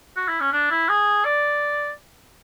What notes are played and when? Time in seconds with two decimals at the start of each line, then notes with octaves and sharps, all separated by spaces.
0.16 F#4
0.28 E4
0.41 C#4
0.53 D4
0.71 E4
0.89 G#4
1.25 D5